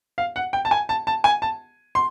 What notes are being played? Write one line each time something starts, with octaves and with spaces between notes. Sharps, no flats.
F5
F#5
G5
A5
G#5
A5
A5
G#5
A5
C6